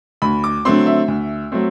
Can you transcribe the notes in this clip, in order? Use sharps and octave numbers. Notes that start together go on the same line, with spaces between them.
D2 B5
D6
D3 F#3 A3 C4 C6
E5
D2
F#3 A3 C4